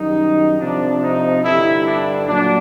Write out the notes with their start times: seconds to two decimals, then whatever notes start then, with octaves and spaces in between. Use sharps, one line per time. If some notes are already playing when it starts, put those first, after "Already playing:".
Already playing: F#2 D#3 G3 D#4
0.59 C3 F3 D4
1.01 D#4
1.43 G2 D3 G3 E4
1.85 D4
2.28 A#2 F#3 D4